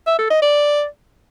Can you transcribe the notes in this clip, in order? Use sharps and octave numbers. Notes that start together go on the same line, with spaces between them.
E5
A4
D#5
D5